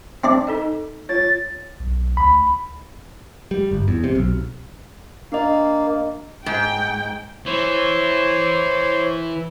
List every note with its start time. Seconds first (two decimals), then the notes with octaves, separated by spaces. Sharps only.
0.24 C4 D4 D5
0.47 D#4 A4 D#5
1.09 F4 C#5 A6
1.80 B1
2.17 D2 B5
3.51 G3
3.71 G1
3.88 E2
4.04 C3
4.15 B1
5.32 A#3 D4 D#5
6.46 G#2 G5
7.46 E3 C5 C#5